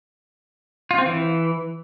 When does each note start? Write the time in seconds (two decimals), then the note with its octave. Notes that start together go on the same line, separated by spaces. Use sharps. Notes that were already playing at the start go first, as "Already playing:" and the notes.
0.91 F4
0.98 C4
1.06 E3